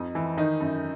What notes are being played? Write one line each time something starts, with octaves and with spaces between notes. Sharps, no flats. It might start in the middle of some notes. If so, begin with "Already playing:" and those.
Already playing: F2 D#4
E3
D#3 D#4
F#2